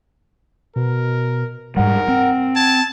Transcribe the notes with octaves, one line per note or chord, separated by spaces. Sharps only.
B2 A#4
G#2 G3 A#4 F#5
C4
A5 G#6